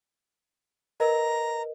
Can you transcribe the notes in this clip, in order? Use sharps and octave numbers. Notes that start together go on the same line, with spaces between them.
A#4 B4 D#5 A#5